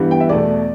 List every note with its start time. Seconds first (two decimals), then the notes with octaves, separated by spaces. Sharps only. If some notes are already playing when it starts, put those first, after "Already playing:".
Already playing: G2 E3 G3 B3
0.11 G5
0.20 E5
0.29 E2 B2 A3 D5